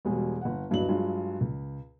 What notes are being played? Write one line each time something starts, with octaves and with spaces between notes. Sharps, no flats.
E1 B2 G3 G#3 G#4
G1 F#5
D1 G2 F#3 B3 D#5 F#7
G2 F#3 G#3 F4
C#2